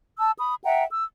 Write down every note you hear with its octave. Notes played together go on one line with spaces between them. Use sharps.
A5 E6
B5 D#6
E5 F#5 G5 A#5
E6